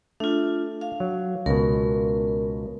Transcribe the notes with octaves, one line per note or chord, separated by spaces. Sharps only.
A3 D4 F4
F5
F#3
C#2 B2 A#4